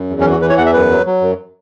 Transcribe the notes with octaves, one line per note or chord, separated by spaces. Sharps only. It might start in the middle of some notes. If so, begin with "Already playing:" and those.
Already playing: F#2
E2
C#4
E3
F#4
E3 B4
C#5
E2 F#5
E5
F#2 B4
F#3
F#3
F#2